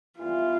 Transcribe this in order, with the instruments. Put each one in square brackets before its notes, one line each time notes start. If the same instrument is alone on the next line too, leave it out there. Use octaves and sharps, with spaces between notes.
[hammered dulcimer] E3 G3 B3 [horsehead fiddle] F4